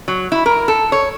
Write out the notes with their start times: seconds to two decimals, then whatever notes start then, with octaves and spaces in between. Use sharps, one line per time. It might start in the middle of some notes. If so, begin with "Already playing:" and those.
0.08 F#3
0.32 E4
0.46 A#4
0.68 A4
0.92 C#5